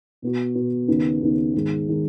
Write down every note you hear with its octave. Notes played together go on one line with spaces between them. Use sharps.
B2 B3 F#4
B2 B3 F#4
D#2 C#3 B3 D#4
D#2 C#3 B3 D#4
G#2 D#3 G#3
D#3 G#3